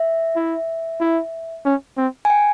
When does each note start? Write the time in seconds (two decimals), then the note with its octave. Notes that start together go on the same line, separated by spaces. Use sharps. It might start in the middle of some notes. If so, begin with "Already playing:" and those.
Already playing: E5
0.36 E4
1.00 E4
1.65 C#4
1.97 C4
2.25 G#5
2.30 G5